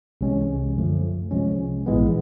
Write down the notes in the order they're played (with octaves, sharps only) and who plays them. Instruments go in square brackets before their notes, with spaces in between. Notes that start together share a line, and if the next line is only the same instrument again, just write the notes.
[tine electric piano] C2 C3 E3 G#3 C#4
F#2 D3 F3 A3
C2 C3 F3 G#3 C#4
A#1 G#2 E3 G#3 B3